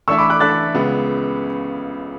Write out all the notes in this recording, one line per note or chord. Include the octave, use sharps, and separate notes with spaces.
E3 A3 D4 A4 E5 C#6 E6
B5 D6
D6 F#6
E3 A3 D4 A4 E5 F#6 A6
C#2 C#3 G#3 B3